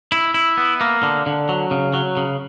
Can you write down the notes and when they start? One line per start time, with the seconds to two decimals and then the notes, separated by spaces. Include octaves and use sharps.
0.12 E4
0.34 E4
0.57 B3
0.81 A#3
1.03 D3
1.26 D3
1.49 F#3
1.71 C#3
1.94 F#3
2.17 C#3